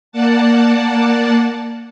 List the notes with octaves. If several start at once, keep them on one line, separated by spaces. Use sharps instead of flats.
A#3 D5 F#5 A5